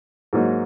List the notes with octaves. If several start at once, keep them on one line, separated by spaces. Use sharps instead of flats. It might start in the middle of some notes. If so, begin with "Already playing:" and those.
G#2 F#3 A#3 D#4